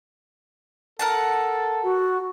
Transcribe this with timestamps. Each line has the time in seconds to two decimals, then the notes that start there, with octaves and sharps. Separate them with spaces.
0.99 A4 A#4 F#5 A5
1.84 F#4